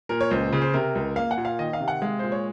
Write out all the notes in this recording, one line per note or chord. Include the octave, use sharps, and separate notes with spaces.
A#2 A#4
C#5
C#2 C5
C#3
C5
C3 A#4
C#2
A#3 F5
F#5
A#2
F5
D#3 D#5
F5
C3
F#5
G#3 F5
A#2 C5
C#5